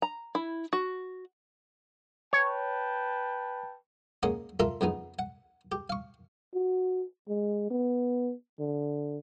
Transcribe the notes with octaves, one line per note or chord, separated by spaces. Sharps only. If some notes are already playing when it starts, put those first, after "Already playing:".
A#5
E4
F#4
B4 C#5 G5 A5
G#3 A#3 C#4 D#5 F#5
F4 A4 A#4 E5 A#5 C6
F2 C#3 B3 D#4
F#5
G4
F5 C#6
F#4
G#3
B3
D3